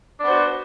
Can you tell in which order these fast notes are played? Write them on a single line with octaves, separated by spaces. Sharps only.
D4 B3 C5 F#4